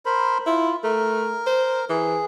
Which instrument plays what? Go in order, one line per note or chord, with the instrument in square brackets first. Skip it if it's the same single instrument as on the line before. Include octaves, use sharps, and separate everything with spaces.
[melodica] A#4 C5 B5
[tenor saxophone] E4 [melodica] F4
[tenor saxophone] A3 [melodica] A#4
[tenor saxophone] C5
[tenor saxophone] E3 [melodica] G#4